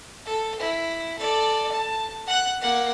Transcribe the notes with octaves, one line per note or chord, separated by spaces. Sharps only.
A4
E4
A4 D5
A5
F#5 F#6
A#3 F#5